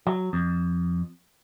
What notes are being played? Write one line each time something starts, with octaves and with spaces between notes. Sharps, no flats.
F#3
F2